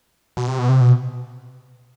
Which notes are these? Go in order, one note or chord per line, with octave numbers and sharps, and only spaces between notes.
B2
C3
B2
C3
B2